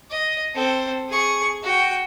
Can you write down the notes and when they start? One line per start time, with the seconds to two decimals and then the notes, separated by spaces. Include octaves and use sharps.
0.10 D#5
0.55 C4 A4
1.09 G#4 C#6
1.63 F#4 G5